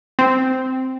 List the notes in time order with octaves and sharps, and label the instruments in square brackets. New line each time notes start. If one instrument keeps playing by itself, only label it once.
[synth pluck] C4